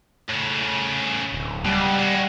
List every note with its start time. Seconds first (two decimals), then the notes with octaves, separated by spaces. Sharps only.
0.29 A2 C#3
1.32 D1
1.65 C#2 B2 G3
1.99 G#3 F#4